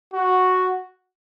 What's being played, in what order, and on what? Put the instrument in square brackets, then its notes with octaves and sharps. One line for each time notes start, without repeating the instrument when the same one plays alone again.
[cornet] F#4